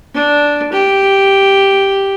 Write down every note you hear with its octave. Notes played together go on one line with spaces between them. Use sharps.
D4
G4